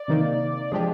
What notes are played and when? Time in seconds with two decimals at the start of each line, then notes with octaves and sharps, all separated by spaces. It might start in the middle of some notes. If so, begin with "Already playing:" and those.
Already playing: D5
0.08 C3 D#3 A#3 D#4
0.72 F3 G#3 D4 G4 G#4